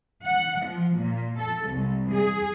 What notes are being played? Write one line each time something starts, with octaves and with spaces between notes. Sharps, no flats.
F#5
F3
A#2
A4
C2
G#4